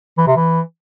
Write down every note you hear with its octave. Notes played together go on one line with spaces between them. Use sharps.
E3
C3
E3